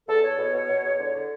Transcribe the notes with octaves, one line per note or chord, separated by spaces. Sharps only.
E2 A4
E2 C#5
B2
B2
B2
E2
D3
D3